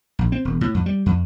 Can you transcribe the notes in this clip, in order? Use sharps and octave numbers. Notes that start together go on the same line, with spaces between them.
A#1
C4
E1
A2
F2
G3
F2